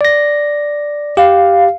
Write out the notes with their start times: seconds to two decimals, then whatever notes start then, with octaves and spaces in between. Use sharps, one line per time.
0.01 D5 A#6
1.17 G4 F5